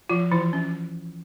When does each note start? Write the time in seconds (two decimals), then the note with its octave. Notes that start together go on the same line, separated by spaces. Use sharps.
0.09 F3 F4
0.32 E3 E4
0.53 C#4